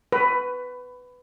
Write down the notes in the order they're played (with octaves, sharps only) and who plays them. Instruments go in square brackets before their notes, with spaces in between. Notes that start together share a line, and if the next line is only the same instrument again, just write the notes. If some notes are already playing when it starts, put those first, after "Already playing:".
[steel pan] B4